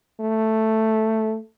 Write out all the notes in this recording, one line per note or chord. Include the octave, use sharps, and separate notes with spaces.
A3